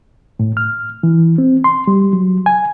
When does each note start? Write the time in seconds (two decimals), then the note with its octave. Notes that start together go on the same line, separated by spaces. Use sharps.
0.39 A2
0.57 F6
1.03 E3
1.38 C4
1.64 C6
1.87 G3
2.13 F#3
2.46 G#5